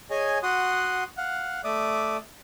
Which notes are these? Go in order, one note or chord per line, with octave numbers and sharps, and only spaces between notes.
G#4 C#5 D#5 G#5
F#4 F#5 C6 D#6
F5 F#5
A3 D5 E5 D6 D#6